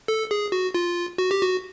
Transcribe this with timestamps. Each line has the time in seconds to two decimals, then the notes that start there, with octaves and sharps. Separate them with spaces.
0.08 A4
0.31 G#4
0.52 F#4
0.74 F4
1.18 F#4
1.31 G4
1.41 F#4